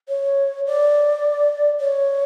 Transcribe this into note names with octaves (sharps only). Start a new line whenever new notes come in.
C#5
D5
C#5